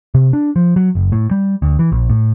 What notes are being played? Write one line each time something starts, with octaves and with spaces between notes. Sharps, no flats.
C3
D4
F3
F#3
F#1
A2
G3
D2
E3
A#1
A2